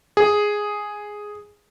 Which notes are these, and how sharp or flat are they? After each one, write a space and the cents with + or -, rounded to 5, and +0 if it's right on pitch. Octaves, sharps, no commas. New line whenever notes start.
G#4 +0